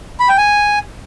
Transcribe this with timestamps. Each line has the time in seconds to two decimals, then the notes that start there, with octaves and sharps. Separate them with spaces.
0.20 B5
0.29 G5
0.37 G#5